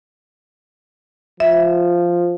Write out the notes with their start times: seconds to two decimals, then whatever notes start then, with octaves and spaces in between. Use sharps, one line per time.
1.40 F3 E5